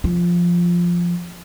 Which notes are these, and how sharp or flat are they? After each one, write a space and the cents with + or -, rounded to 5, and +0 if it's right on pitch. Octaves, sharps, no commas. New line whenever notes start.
F3 +0 F4 +0